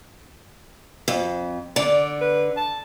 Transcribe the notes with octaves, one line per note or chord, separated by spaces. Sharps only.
F2
D3 D5
B4
A5